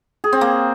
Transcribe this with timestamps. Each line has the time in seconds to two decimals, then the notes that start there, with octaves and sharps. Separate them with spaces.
0.24 G#4
0.33 C4
0.41 A#3